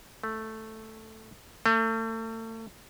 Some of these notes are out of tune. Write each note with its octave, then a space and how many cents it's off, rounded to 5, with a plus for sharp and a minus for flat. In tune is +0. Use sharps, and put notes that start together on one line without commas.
A3 +0
A3 +35